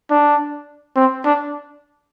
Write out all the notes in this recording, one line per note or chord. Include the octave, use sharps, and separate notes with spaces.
D4
C4
D4